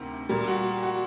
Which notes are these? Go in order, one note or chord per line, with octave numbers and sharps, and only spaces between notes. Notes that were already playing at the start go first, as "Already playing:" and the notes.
Already playing: D2 C3 D#3
A#2 G3 A#4
F#4
F#4